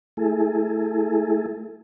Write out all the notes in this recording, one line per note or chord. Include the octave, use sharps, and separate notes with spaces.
A3 E4 G#4 A4